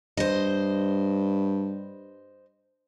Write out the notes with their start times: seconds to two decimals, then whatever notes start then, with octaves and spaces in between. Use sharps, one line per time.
0.17 G2 C5 D#5